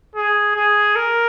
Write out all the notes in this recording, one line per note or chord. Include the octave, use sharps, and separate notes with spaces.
G#4
G#4
A#4